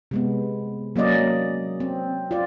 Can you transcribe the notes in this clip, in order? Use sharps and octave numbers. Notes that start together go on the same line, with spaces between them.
C3 G#3 B3
F#3 A#3 C#4 D5 D#5
C4
F4 D5